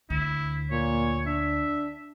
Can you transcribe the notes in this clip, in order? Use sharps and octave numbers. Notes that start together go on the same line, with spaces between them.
D2 E4
A#2 C#5
D4 E5